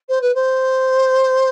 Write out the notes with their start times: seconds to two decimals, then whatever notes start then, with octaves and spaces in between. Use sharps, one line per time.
0.09 C5
0.21 B4
0.35 C5